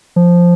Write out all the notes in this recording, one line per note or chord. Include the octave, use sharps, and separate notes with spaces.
F3